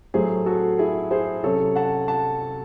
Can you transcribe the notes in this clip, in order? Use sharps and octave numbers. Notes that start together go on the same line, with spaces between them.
A2 F#3 A3 G#4 C5
F#4 A4
E4 G#4
G#4 C5
C3 F#3 C#4 A4 C#5
F#5 A5
F#5 A5